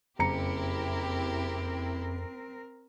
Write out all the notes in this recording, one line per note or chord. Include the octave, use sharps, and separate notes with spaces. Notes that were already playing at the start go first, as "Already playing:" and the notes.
F#1 F2 C4 E4 G4 A#4 A#5 C#7